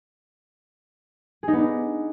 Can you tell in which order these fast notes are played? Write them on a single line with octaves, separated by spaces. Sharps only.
G#4 D#4 B3 D4